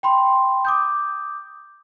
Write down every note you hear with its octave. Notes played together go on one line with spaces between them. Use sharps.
G5 B5 C6
D6 D#6 G6